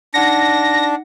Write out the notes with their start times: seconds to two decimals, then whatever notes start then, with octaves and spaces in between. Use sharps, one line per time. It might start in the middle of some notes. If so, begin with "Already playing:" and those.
0.14 D4 D#4 F#5 A#6 C#7